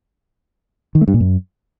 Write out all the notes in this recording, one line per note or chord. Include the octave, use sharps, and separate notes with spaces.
D#3
A3
G2
A#2
F#2